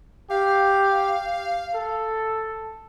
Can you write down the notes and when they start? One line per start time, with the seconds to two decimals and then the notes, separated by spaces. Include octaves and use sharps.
0.31 G4 F5
1.74 A4